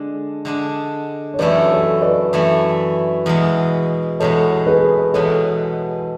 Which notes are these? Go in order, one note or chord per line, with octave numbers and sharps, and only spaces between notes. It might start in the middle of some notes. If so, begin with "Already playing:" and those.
Already playing: D3 G#3 D4
D3 G#3 D4
C#5
F#2 E3 A3 E4 B4 D5
A4 C#5
B4 D5
F#2 E3 A3 E4
E2 B2 G#3
E2 B2 G#3 A4 C#5
G#4 B4
E2 B2 G#3 A4 C#5